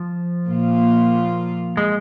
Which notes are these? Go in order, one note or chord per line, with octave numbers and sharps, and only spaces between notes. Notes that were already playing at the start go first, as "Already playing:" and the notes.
Already playing: F3
A#2 A#3 F4
G#3